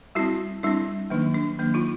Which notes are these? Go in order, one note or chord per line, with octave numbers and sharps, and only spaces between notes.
G3 C4 E4 F#4
G3 C4 D4 E4
D#3 F#3 A#3 D4 D#4
D4
D#3 F#3 A#3 D4
D#4 F4